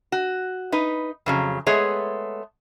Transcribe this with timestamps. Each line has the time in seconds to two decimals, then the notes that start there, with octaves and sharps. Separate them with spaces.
0.12 F#4
0.72 D#4 B4
1.26 F2 C#3 F#3
1.67 G#3 A3 B3 G#4 C#5